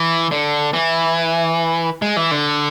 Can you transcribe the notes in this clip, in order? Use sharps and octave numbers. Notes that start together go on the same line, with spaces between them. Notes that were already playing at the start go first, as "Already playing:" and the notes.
Already playing: E3
D3
E3
G#3
E3
D3